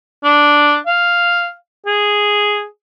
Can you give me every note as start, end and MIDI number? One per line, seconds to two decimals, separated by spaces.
0.24 0.76 62
0.87 1.52 77
1.86 2.65 68